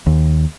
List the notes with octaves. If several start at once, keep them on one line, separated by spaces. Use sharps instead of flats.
D#2